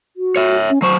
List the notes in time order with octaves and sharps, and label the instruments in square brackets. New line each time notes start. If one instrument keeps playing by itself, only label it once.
[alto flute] F#4
[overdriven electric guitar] C#5 E5
[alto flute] C#4
[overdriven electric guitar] F#3 C5 [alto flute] C#6